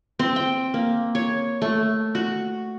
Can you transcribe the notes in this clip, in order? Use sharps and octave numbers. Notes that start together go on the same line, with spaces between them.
C4
G5
A#3
C#5
A3
F#4